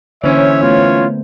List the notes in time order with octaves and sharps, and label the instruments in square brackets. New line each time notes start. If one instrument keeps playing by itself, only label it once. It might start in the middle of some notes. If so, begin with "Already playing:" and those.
[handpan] D3 A#3 C5 [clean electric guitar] E3 C#4 [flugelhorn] C#5 [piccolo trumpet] E5
[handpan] A3 B3 [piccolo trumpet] F4